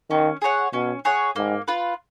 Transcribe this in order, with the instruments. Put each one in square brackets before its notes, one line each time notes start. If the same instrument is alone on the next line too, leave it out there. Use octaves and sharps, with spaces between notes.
[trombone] D#3 [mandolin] C#4
[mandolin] G#4 C#5 F#5
[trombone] B2 [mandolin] C#4
[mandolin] G#4 C#5 F#5
[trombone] G#2 [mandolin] A#3
[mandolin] F4 B4